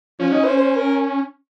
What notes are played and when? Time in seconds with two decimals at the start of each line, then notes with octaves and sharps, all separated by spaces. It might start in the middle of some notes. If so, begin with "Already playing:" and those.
0.20 F3 C#4
0.32 D#4
0.45 C5
0.57 C5
0.76 A#4